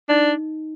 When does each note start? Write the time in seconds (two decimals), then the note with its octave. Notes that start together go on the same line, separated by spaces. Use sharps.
0.09 D4 D#4